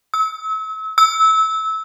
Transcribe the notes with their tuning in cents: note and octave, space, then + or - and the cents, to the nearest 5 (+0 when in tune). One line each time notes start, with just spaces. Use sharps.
E6 -35
E6 -20